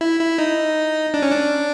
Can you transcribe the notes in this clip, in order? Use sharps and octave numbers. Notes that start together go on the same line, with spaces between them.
E4
E4
D#4
D4
C#4
D4